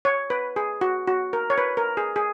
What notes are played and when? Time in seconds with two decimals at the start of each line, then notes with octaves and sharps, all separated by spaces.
0.05 C#5
0.30 B4
0.56 G#4
0.81 F#4
1.07 F#4
1.33 A#4
1.50 C#5
1.58 B4
1.77 A#4
1.97 G#4
2.16 G#4